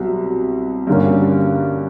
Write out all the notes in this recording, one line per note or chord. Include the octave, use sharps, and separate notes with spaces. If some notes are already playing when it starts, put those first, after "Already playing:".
Already playing: C2 B2 F#3
G2 D3 G3 A#3 C#4